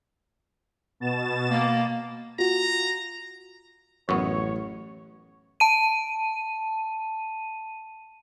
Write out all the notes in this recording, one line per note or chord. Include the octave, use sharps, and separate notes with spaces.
B2 A6 E7
A#3
F4 F#4 A#5
A1 F#2 B3 C#5 C#6
A5 D#7